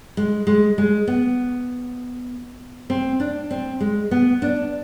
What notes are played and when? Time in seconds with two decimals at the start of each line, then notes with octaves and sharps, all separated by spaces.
0.17 G#3
0.47 G#3
0.78 G#3
1.07 B3
2.90 C4
3.20 D4
3.51 C4
3.80 G#3
4.11 B3
4.42 D4